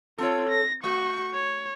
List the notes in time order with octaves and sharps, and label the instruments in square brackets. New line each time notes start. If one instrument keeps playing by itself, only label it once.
[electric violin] C4 F4 [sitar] A4 C#5
[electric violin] A#6
[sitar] A3 [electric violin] F#4 C#6
[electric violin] C#5